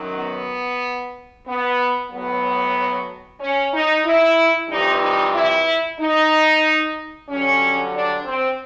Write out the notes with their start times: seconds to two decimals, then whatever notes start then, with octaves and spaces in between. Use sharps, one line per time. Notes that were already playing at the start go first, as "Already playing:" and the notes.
Already playing: F#2 D#3 F#3
0.17 B3
1.47 B3
2.12 A2 F#3 B3
3.41 C#4
3.74 D#4
4.06 E4
4.70 F2 C3 E3 G3 D#4
5.02 D#4
5.35 E4
6.00 D#4
7.29 G2 D3 F#3 C#4
7.94 D4
8.26 C4